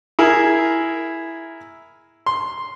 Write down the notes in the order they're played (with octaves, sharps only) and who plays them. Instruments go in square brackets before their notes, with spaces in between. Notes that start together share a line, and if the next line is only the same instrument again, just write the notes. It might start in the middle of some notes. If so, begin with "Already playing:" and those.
[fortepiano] E4 G#4 A#4
C6